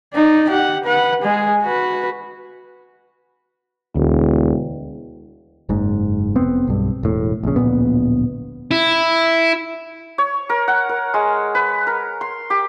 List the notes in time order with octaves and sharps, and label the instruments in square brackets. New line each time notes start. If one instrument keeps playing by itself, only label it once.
[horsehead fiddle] D#4 D5
G4 F#5
B4 F#5
G#3 G#4
F#4 B4
[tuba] E1 [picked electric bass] D2
[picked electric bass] F#1 G#2
F1 B3 C4
B1 G2
E1 A2
A#1 C#3
D1 A#1 A#2 B3
[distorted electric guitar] E4
[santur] C#5
A#4
F#5
A#4
G#3
B4
A#4
C6
G4